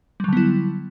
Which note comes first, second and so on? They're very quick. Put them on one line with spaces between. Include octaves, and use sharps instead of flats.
G3 F#3 D3 B3 E4